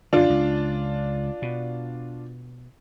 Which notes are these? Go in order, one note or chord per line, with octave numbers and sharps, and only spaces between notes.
F#2 D3 D4 F4
C#2
B2